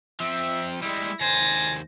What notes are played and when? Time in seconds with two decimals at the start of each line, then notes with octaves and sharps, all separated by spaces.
0.20 F3 C4 E5
0.82 G3 G#3 E4
1.21 D#2 C5 G#5 A6 A#6